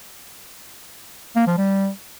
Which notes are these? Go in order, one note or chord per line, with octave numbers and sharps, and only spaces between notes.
A#3
F3
G3